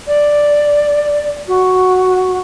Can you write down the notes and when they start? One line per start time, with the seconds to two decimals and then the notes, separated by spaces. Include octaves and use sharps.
0.07 D5
1.48 F#4